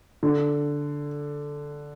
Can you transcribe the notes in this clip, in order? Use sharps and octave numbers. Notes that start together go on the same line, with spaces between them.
D3